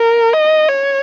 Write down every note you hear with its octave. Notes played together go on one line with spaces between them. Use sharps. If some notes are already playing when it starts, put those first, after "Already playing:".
Already playing: A#4
D#5
C#5